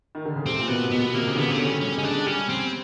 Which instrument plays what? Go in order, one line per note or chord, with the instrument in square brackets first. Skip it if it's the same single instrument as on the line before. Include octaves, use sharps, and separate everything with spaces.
[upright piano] D#3
D3
C#3
[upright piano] C3 [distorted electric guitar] C4
[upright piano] A#2
[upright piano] B2 [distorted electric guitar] B3
[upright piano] B2 [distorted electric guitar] B3
[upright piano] C3 [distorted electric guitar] A#3
[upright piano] C#3
[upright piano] D3 [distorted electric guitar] B3
[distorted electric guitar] C4
C#4
[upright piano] G3
[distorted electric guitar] C#4
[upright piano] G#3 [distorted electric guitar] C#4
[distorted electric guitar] D4
[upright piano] G3 [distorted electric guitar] C#4
[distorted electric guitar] C4